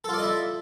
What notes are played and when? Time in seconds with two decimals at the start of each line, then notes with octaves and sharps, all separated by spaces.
0.04 A4
0.09 F4
0.14 D5
0.18 D#5
0.23 E4